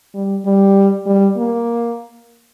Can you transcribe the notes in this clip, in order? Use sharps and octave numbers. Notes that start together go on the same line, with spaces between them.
G3
G3
G3
A#3